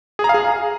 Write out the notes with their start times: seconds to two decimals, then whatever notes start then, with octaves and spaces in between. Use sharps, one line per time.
0.19 G#4
0.24 A#5
0.29 F5
0.34 G#4